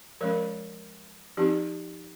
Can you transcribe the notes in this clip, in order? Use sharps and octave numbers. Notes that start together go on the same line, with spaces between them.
F3 G#3 C#4 A#4 C#5
F3 C4 D#4 G4